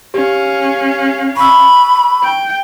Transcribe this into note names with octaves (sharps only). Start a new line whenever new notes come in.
C#4 G4 F5
B5 C#6 E6
G5